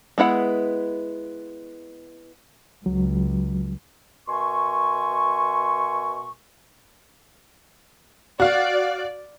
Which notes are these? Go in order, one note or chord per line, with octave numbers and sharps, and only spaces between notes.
G#3 B3 E4 F#5
C#2 F#3
B2 A#4 E5 G#5 C6 C#6
F#4 D5 F5